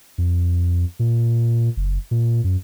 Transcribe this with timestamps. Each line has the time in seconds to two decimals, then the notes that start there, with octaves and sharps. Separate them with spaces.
0.18 F2
0.99 A#2
1.77 F#1
2.11 A#2
2.44 F#2